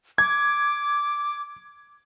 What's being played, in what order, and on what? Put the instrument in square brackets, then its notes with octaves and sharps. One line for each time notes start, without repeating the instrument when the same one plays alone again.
[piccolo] D6 [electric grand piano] G#6